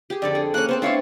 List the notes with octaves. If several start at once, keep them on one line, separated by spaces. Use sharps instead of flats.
G4 G#4
F2 D3 A4 D5
G#4
A#3 C#4 F#6
B3 C4 A4 C5
A3 D4 E4 A4 C#5 F5